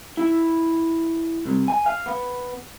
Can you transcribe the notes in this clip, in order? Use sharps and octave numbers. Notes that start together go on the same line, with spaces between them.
E4
C2
G#5
F5
B3